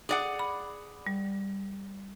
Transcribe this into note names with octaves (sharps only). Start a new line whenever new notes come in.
G#4 D5 F#5
B5
G3